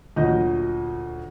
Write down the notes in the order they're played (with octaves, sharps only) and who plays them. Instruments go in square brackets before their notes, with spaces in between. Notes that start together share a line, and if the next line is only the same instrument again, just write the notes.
[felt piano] D2 A#2 F#3 D#5 G6